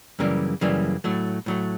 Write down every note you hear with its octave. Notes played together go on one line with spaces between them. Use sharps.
F#2 C#3 E3 G3 A#3
F#2 C#3 E3 G3 A#3
A2 F#3 A3
A2 F#3 A3